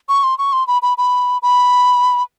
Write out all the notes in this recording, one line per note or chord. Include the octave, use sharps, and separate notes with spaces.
C#6
C6
C#6
C6
B5
B5
B5
B5